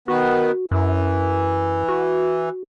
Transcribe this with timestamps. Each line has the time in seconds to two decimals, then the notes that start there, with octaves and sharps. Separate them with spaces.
0.08 D#3 B3 F#4
0.71 F#2 E3
1.88 F#4